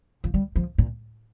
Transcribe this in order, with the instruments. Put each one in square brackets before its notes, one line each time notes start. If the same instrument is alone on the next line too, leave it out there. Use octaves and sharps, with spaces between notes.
[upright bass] F3
G3
F3
A#2